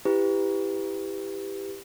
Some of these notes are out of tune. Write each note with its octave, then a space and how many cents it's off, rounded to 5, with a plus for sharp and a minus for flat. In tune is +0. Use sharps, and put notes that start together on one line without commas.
E4 +0 G4 +10 B4 +20